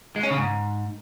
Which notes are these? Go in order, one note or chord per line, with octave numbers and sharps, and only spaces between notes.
G#3
C#4
C#3
G#2